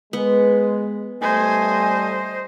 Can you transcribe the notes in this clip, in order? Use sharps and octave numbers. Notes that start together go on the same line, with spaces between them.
G#3 B3
G3 A3 C5 D#5 G#5